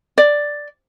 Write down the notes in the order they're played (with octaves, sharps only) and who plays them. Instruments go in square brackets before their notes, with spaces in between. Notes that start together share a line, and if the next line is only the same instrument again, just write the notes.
[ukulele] D5